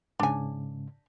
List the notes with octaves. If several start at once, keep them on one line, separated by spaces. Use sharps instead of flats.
G#2 C#3 D4 G#5